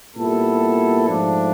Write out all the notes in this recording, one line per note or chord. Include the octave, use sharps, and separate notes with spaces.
A#2 G3 B3 E4 A4
G#2 F3 A3 D4